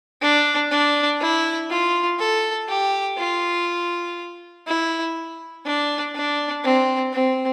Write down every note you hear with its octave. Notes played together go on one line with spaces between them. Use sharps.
D4
D4
E4
F4
A4
G4
F4
E4
D4
D4
C4
C4